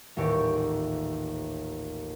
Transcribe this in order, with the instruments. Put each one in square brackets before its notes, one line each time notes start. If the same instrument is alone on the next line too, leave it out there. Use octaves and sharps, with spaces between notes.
[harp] D#1 A1 D#2 G4 C#6